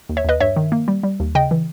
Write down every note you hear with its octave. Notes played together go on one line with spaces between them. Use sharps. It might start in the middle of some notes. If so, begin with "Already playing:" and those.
D#2
C#5 E5
D#2 B4 D#5
G2 C#5 E5
D#3
A#3
G3
G3
D#2
C#3 D#5 G5
E3